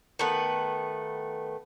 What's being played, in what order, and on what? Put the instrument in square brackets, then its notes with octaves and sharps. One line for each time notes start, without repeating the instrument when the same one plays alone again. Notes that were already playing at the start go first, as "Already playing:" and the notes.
[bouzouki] D#3 A3 B3 B4